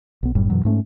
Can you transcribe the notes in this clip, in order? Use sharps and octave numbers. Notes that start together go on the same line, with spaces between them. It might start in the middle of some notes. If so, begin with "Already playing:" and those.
B1 B3
F#1 F#2 A2 G3
F#2 B2 E3 F#3
G#2 A3 C#4